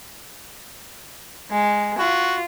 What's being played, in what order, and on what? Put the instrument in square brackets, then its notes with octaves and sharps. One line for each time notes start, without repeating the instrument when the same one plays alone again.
[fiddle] G#3
[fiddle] F4 [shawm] F#4